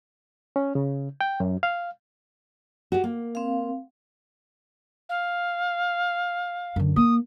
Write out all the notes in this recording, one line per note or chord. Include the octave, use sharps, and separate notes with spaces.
C#4
C#3
G5
F#2
F5
F#4 G4
A#3
C4 F5
F5
F#2 D3
A#3 D#6